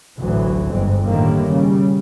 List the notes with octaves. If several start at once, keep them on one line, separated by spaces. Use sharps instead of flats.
A1 D2 A2 E3 F#3
G1 F2 G#2 C4
A2 D3 D#3 G3 A#3
C#3 G3